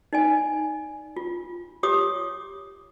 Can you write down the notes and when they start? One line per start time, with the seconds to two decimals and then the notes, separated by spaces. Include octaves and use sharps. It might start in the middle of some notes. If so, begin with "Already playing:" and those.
0.13 D#4 D5 G#5
1.17 F4
1.83 F4 G4 C#5 D6 D#6